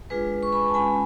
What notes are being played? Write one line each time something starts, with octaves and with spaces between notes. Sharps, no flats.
G#3 D4 F4 G#4 B4
C#6
G#5 B5
A5
G#3 C#4 F4 G#5 B5